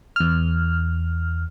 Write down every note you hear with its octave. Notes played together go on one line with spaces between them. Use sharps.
E2 F6